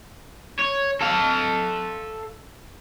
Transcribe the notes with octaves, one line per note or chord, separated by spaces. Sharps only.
C#5
A4 F5